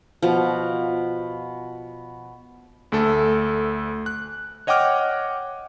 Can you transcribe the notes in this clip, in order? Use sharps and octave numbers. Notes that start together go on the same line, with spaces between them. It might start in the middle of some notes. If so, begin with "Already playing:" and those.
B2 F3
D2 A3 A4
F#6
C#5 D#5 F#5 G5 D6 F6